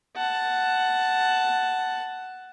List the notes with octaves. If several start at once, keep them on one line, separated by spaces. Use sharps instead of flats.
F#5 A5